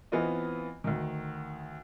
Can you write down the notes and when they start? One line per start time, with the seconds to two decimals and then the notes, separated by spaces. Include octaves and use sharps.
0.12 E3 B3 C4 F4 D#5
0.84 D2 D#3